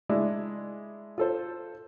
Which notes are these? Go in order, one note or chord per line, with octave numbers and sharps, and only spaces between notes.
G#3 D4 E4
F4 A4 C5